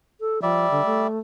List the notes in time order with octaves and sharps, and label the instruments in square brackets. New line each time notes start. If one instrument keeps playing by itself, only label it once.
[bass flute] A4
[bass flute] F3 [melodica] G3 D5 E5
[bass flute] D3
A3